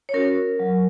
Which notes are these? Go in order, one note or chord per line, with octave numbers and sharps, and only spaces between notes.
C#5
C#4 F#4 A#4
F#3